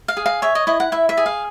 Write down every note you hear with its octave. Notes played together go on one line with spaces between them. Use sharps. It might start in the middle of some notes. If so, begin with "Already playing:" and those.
F5
G#4
F5
C#5 E5
D#5
E4 D#5
F#5
E4 E5
E5
G#4
F5